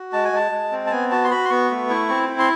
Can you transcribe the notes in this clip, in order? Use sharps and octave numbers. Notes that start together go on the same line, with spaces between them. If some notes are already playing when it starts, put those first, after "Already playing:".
Already playing: F#4
G#3 A5
G#5
G#3 A5
G#3
C4
A5
B3 G#5
F#4 A5
C6
F#4 B5
C6
B3 C#6
A3
E4
C4
E4
C6